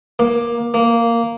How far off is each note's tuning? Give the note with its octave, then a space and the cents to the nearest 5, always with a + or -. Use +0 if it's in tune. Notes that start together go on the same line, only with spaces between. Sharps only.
A#3 +20
A#3 -5